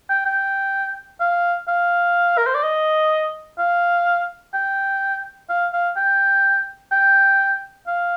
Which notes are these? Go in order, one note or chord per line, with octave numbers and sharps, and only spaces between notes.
G5
G5
F5
F5
A#4
C5
D5
D#5
F5
G5
F5
F5
G5
G5
F5